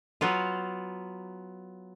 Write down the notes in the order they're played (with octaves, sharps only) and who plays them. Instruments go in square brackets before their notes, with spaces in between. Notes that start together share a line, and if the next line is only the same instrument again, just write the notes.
[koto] F#3 B3 F4